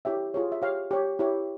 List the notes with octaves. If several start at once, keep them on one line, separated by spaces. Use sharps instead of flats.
E4 G4 C#5 E5 G5
F4 G#4 C#5
E5
G4 C#5 F5
G4 C#5
E4 G4 C#5